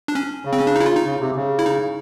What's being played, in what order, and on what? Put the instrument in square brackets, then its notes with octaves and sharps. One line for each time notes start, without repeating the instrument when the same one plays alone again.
[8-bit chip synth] D4
C#4
[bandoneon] C#3
[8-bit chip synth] C4
C#4
D4
D#4 E4
F4
D#4
[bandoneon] C#3
C3
C#3
[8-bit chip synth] E4
D#4